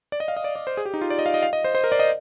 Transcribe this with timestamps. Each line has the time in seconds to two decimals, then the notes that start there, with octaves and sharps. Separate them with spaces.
0.12 D5
0.20 D#5
0.28 F5
0.37 D#5
0.44 D5
0.56 D5
0.67 C5
0.77 G#4
0.85 G4
0.94 D#4
1.01 F4
1.10 D5
1.19 D#5
1.26 F5
1.34 D#5
1.43 F5
1.53 D#5
1.64 C5
1.75 C5
1.84 A#4
1.92 D5
1.99 D#5